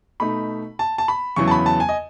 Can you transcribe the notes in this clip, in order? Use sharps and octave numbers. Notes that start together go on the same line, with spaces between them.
B2 A3 D#4 B5
A5
A5
B5
E2 C#3 F#3 B3 E4 C#6
A5
B5
A5
G#5
D#5